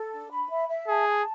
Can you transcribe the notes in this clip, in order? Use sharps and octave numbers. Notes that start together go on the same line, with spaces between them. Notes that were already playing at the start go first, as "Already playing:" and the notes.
Already playing: A4
D4
B5
E5
E5
G#4 A5
A5